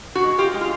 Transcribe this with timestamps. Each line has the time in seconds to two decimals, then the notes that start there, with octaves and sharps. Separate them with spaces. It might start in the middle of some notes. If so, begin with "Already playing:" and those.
0.15 F#4
0.23 G#3
0.38 F4 G4
0.54 G#3
0.61 F4